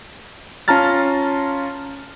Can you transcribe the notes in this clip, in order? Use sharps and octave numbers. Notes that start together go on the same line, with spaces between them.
C#4 F4 A5 A#5 F6 A6